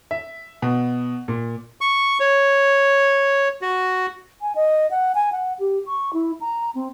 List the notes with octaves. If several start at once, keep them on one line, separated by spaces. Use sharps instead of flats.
E5
B2
A#2
C#6
C#5
F#4
G#5
D#5
F#5
G#5
F#5
G4
C#6
E4
A#5
C4